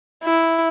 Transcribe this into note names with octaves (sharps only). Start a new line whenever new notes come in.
E4